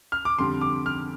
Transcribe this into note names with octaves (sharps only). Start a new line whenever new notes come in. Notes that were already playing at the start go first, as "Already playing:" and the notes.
F6
D6
F2 D3 G3 C6
D6
F6